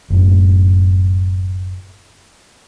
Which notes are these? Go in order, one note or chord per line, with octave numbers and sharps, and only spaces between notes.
F#1 F#2 A2